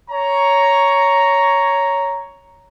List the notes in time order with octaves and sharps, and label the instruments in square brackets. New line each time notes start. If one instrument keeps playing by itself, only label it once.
[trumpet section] C#5 A#5